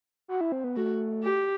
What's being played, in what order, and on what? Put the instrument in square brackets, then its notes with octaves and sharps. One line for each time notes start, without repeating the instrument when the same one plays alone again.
[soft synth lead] F#4
E4
C4
B3
[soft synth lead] A3 [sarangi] F#4
[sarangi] G4